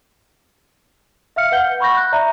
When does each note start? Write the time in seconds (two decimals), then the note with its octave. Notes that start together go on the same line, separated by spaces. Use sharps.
1.36 E5 F5 F6 C#7
1.52 B4 F#5 G6 G7
1.80 B5 C#6 G6 A#6
1.97 F#6
2.12 D5 E5 A#5